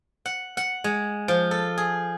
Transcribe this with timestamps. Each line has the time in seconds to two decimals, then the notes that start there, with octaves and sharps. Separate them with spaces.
0.26 F#5
0.57 F#5
0.84 G#3
1.28 F3
1.51 A4
1.78 G#4